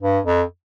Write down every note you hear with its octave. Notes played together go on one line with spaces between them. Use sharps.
G2
F2